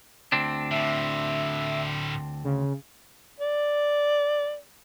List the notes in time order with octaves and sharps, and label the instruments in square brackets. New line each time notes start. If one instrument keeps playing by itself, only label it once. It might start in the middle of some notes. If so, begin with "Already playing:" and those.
[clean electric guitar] D2 C4 D4
[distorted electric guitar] A2 D3 [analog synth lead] E5
[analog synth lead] C#3
[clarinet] D5